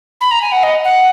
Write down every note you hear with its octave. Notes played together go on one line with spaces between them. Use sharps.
B5
A#5
G#5
F#5
D#5
F#5